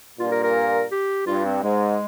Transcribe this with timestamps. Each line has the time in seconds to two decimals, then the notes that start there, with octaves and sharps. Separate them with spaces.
0.19 G2 A#2 F4
0.31 A#4
0.43 A#4
0.91 G4
1.27 G2 F4
1.45 C4
1.63 G#2 G#3